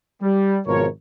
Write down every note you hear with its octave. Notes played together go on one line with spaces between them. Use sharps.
G3
G#1 G#2 B2 F3 A#4 C#5